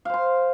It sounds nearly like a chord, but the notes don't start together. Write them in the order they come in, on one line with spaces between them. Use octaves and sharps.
F5 C5 C6